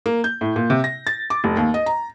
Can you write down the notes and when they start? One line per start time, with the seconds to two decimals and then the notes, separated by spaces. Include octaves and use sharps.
0.06 A#3
0.24 G6
0.41 A2
0.56 A#2
0.70 C3
0.84 A#6
1.07 A6
1.30 D6
1.44 F1
1.57 D#2
1.74 D#5
1.86 A#5